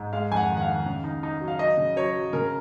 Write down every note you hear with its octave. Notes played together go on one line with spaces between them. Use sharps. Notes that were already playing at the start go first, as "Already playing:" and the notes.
Already playing: G#2
G#3 F5
F2 F#5 G#5
D#3
F#5
F5
D#3
C#3
D#4
D#4
F#3
F5
F#3 D#5
C#3
F#3 C#5
F#3
C#3 A#4